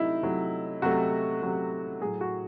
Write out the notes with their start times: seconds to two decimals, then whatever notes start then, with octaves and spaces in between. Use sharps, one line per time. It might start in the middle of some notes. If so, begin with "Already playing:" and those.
Already playing: C3 F#3 A3 D#4 E4
0.23 C3 F#3 A3
0.82 C3 F#3 A3 F#4
1.42 C3 F#3 A3
2.01 A2 F#3 A3 G#4
2.21 F#4